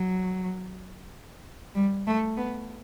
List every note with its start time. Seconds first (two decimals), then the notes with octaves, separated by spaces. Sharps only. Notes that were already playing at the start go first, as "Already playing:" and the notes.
Already playing: F#3
1.75 G3
2.07 A3
2.37 B3